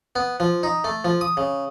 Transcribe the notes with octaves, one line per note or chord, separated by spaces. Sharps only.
B3
F3
D#4
A3
F3
D#6
C#3